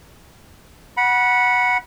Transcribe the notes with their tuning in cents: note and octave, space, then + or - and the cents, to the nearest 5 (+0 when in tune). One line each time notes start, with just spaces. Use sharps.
F#5 +0 B5 -25